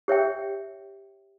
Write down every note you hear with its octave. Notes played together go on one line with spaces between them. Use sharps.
G4 C#5 E5 G5